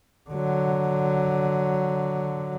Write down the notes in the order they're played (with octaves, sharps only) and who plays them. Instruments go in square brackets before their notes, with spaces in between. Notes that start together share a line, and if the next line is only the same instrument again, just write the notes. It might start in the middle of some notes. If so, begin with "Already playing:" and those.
[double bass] D3 F#3